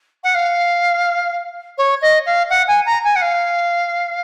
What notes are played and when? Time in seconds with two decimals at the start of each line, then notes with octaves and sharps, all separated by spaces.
0.24 F#5
0.35 F5
1.78 C#5
2.02 D#5
2.26 F5
2.50 F#5
2.68 G#5
2.86 A#5
3.04 G#5
3.16 F#5
3.22 F5